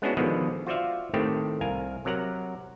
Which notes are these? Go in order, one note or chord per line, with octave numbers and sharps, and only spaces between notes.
G#3 B3 C#4 D4 E4 F#4
B2 D3 D#3 F3 G#3 B3
F4 F#4 C5 D5 E5 F5
A2 D#3 A3 C4 G4
C2 A#4 F5 G#5
C3 F#3 A#4 F#5 A#5